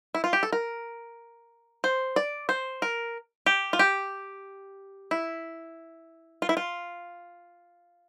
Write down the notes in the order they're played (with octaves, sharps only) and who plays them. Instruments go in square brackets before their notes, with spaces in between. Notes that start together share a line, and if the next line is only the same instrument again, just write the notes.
[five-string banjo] E4
F4
G4
A4
A#4
C5
D5
C5
A#4
G4
F4
G4
E4
F4
E4
F4